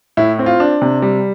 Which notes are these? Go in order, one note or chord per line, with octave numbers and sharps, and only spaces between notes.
A2 E4
C4
F4
D4
C3
G3